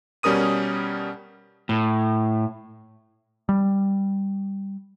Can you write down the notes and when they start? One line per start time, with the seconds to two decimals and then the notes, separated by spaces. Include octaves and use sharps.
0.23 B2 G3 C#4 A#4 D#6 D#7
1.69 A2
3.49 G3